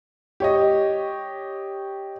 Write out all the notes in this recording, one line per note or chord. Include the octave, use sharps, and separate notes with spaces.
G4 C#5 D#5